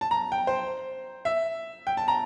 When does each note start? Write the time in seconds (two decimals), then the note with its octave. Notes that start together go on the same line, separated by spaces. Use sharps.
0.01 A5
0.11 A#5
0.32 G5
0.47 C5
1.25 E5
1.87 G5
1.97 A5
2.08 A#5